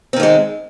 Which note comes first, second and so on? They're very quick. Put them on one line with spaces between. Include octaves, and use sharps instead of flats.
C4 D#3 A#3 G#3